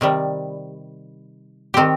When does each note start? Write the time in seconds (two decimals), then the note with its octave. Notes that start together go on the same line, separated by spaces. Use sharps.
0.01 C3 D#3 G3
1.74 D#3 C4 G4